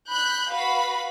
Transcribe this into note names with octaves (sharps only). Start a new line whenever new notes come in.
B5 F#6 G6
F#4 B4 F5 B5